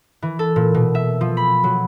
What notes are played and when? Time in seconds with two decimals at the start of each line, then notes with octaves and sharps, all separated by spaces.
0.22 E3
0.39 A4
0.56 A#2
0.74 B2
0.95 E5
1.21 F3
1.37 B5
1.64 F#3